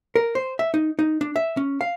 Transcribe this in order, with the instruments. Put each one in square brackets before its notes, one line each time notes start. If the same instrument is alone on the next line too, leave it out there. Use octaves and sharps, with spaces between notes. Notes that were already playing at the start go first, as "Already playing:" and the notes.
[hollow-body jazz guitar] A#4
C5
E5
D#4
D#4
D4
E5
C#4
F5